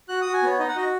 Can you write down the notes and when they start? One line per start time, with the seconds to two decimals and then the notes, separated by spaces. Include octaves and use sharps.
0.09 F#4 F#6
0.22 F#4 D#6
0.34 G#5
0.43 B3 C#5
0.59 D#4 D#5
0.68 F#5
0.76 F#4 D#5